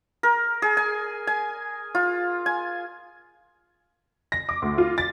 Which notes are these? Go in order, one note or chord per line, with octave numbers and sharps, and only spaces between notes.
A#4
G#4
G#5
G#5
F4
G#5
A#6
D6
D2
F4
A6